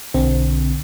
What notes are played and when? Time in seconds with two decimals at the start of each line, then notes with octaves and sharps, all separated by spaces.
0.14 B1 D3 C4